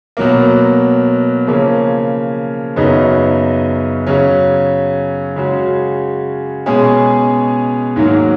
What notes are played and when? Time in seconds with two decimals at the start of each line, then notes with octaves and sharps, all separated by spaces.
0.17 B2 F#3 A#3
1.47 C#3 F3 A#3 C#4
2.76 F#2 C#3 F#3 B3 D#4
4.06 C#3 F#3 C#4
5.36 C#3 G#3 C#4 F#4
6.66 B2 G#3 C#4 G#4
7.96 G#2 D#3 F#3 A#3